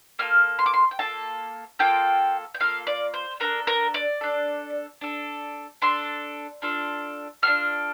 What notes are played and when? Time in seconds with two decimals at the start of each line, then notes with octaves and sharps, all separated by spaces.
0.19 A#3 F4 A4 F6
0.59 C6
0.66 D6
0.74 C6
0.91 G5
0.99 A#3 F4 A4 A5
1.79 A#3 F4 A4 G5
2.54 G5
2.60 A#3 F4 A4 F5
2.87 D5
3.14 C5
3.40 D4 A4 A#4
3.67 A#4
3.94 D5
4.21 D4 A4
5.01 D4 A4
5.82 D4 A4 C6
6.62 D4 F4 A4
7.43 D4 F4 A4 F6